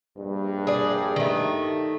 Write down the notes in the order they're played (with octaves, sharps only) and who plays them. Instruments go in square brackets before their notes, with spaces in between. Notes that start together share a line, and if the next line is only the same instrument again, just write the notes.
[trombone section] A#1 G2
[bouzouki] G#4 D5
D#3 A3